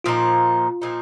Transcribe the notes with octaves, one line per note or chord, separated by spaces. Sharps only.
A#2 F3 D#4 F4
A#2 F3 D#4